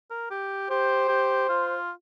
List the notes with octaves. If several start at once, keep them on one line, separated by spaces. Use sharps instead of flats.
A#4
G4
G4 C5
G4
F4